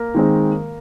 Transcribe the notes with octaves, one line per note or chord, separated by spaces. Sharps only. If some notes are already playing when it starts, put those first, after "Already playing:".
Already playing: A#3 A#4
D#3 G#3 C4